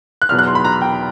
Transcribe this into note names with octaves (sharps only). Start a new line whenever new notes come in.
F#6
E2 B2 F#3 F6
F#6
C6
B5
A#5
G5